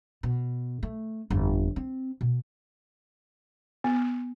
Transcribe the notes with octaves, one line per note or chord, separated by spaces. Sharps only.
B2
A3
G1 F2
C4
B2
B3